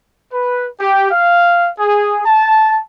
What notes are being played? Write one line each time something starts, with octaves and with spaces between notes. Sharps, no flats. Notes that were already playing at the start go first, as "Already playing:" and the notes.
B4
G4
F5
G#4
A5